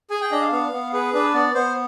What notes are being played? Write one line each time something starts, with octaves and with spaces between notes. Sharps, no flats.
G#4 G#5
G5
D4 D#5
F5
B3 F5
B3
G#4 B4
D4 B4
B3 D5
B3 C5